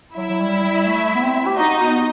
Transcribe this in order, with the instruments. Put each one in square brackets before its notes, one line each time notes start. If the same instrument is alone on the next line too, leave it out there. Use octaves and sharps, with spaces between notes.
[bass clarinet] F#3 [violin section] E4 E5
[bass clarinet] F#3
G3
G3
A3
B3
C4
G4
[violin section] D#4 D#5 [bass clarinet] F#4
[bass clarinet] B3